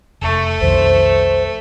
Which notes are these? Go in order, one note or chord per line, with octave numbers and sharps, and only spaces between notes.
F1 A3
B1 F2 D#3 C5